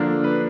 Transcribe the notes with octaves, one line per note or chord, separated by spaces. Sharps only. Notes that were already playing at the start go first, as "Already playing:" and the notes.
Already playing: D3 F3 A#3 D4
B4